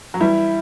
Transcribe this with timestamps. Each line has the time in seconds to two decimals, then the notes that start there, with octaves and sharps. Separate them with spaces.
0.14 F#3
0.20 E3 G3 E4